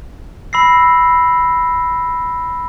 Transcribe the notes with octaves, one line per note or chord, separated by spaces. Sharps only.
B5 E6 A#6 C7